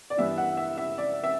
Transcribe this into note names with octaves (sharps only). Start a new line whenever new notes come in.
D5
G2 E3 B3 E4 E5
F#5
E5
E5
D5
E5